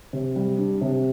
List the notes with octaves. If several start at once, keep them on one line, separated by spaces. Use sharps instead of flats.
C3
G3
D4
C3